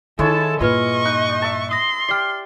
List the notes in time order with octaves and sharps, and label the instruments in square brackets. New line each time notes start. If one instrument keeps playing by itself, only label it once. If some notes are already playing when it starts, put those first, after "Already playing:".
[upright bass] D#3 [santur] G#3 E4 C#5 [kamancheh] A4 A5
[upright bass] G2 A#2 [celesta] F4 B4 F6 [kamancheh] D#5 C#6 [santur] C6
[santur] D#4 [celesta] F#6
[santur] E5 A5
[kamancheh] C6 [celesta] D#6 A#6
[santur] G4 D5 [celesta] F6 C7